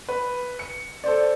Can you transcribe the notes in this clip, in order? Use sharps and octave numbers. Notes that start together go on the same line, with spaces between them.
B4
C#7
A4 C5 D5